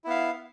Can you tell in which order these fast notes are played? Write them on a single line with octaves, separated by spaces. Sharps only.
E4 B3 F5